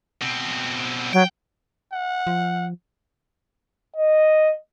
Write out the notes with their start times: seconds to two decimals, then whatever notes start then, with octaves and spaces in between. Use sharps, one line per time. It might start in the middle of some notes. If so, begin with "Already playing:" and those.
0.22 B2 C4
1.13 F#3 G5
1.93 F#5
2.27 F3
3.96 D#5